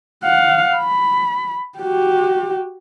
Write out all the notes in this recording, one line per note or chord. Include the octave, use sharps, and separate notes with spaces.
F5 F#5
B5
F#4 G4